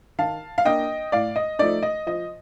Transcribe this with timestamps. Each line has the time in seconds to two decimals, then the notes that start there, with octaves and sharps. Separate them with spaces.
0.18 D#3 F5 A5
0.58 F5
0.65 A#3 D4 D#5 G5
1.12 A2 D5 F5
1.36 D#5
1.59 F3 A3 D#4 D5
1.83 D#5
2.07 F3 D#5